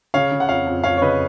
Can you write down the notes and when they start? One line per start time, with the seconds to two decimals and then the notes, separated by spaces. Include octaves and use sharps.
0.14 C#3 C#5 F5
0.32 C#3
0.40 F#5
0.49 F2 C#5 F5
0.66 F2
0.84 F2 C#5 F5
0.97 C#5
1.02 C#3 B4 D#5